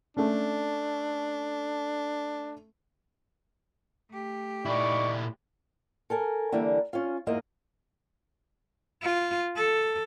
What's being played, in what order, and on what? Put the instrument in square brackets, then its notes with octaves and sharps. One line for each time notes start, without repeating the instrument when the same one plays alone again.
[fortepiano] A3 C#4 [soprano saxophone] D4
[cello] A3 G4
[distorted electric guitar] A#2 E4 [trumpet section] D#4 B5 C#6 [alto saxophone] D5
[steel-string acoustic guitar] A4 A#4 G#5
D3 E3 G3 A#3
C#4 F4
E2 G#2 A#3 F4 D#5
[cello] F4
A4